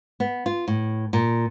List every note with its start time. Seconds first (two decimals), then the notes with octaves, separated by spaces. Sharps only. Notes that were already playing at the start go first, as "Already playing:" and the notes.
0.20 B3
0.46 F4
0.68 A2
1.13 A#2